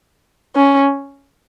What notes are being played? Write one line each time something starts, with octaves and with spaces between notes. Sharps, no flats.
C#4